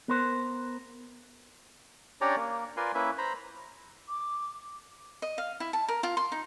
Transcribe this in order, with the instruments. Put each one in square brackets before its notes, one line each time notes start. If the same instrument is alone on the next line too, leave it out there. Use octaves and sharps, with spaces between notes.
[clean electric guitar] B3 A#4 C5
[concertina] C#4 D4 G4 C#5 D5 A#5
A#3
F4 A#4 B4 D5 G#5 C6
A#3 C#4 E4 B4 E5
C5 A#5 B5
[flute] D6
[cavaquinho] D#5
F5
E4
A5
A#4
F4
C6
D#4